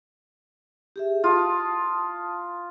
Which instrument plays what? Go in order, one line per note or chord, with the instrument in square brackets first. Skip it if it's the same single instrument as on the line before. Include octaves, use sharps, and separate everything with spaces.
[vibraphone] G4 G#4 E5
[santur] F4 [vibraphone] A5 D#6